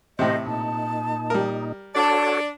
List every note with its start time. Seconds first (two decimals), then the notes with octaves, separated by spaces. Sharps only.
0.19 A2 C3 G4 C5 D#5
0.46 A#2 D#4 A5
1.30 G3 A#4
1.95 D4 F#4 A4 C#5 D5 A5